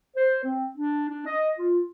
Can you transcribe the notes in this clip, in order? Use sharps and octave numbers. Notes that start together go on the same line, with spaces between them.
C5
C4
D4
D4
D#5
F4